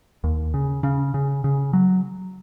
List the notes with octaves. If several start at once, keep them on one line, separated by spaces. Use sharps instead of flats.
D#2
C#3
C#3
C#3
C#3
F#3